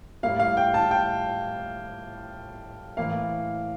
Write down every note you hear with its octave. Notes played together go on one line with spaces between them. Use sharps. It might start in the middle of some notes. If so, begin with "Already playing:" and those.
A2 G3 A#3 F5
F5
G5
A5
G5
A2 E3 A#3 F5